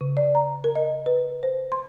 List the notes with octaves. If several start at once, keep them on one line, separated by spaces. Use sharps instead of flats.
C#3
D5
A#5
A#4
D#5
B4
C5
C6